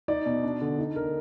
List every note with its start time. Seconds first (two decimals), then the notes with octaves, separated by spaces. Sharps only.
0.08 D#4 D5
0.26 B2
0.43 D4
0.61 D3
0.79 D#4
0.96 D3 A#4